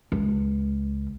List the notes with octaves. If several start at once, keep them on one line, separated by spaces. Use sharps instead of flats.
C#2